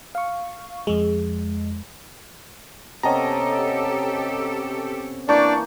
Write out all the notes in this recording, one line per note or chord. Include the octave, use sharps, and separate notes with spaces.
F5 C#6
F2 G#3
C3 B3 C#4 G4 A4 D#5 A5 A#5
E3 A#3 D4 D5 A5 C#6 G6